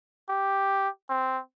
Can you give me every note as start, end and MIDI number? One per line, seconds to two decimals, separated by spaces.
0.29 0.89 67
1.09 1.40 60